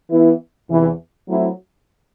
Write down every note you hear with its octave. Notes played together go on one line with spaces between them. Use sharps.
E3 B3 E4
E2 C3 E3
F#3 A3 C4 E4